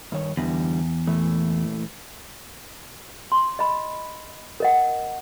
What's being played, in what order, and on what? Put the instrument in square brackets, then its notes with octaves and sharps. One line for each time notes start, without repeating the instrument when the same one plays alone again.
[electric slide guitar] G2 D#3 C#5
[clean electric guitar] E2 [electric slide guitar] D3 E3 G3
[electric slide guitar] A#2 E3 A3
[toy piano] C6
D#5 B5
A#4 D#5 F#5